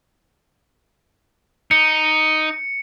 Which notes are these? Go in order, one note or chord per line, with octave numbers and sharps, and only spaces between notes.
D#4 C#7